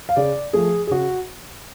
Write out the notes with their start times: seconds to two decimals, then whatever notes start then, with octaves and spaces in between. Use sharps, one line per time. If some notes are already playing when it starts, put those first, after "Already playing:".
0.09 F5
0.16 C#3 D5
0.53 F3 A3 G#4
0.87 G#4
0.91 C#3 F#4